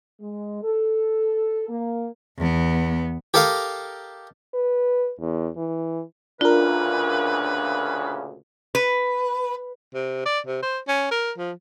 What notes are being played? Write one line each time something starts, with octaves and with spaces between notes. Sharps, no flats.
G#3
A4
A#3
E2 B3
G4 A4 A#4 D#5 F5
B4
E2
E3
D2 A#2 C#3 D4 F4 A#4 B4
B4
C3
D5
C3
C5
C#4
A#4
F3